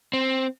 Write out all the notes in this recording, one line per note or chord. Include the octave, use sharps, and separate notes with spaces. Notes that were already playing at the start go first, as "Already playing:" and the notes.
C4